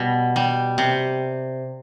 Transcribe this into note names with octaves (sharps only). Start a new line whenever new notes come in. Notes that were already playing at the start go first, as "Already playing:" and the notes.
Already playing: B2 G3
G3
C3